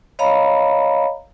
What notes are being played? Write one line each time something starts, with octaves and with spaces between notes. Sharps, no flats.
C#5 D#5 F5 A#5 B5